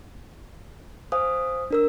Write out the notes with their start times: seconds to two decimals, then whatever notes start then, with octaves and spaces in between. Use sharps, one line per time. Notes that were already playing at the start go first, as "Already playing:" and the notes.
1.12 C5 F5 G#5 D#6
1.71 D4 A#4 E6